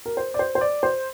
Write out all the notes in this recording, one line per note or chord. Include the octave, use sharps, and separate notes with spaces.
A#4
C5
D5
C5
C5
D5
C5